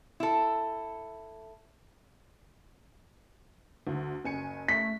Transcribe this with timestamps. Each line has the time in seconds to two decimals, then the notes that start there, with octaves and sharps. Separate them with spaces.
0.20 E4 A4
3.87 D2
4.25 F#1 G#5 C#7
4.68 A3 B6